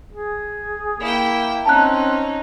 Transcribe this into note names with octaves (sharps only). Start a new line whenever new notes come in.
G#4
A#3 E4 G5
C4 C#4 D#4 A5 A#5 F#6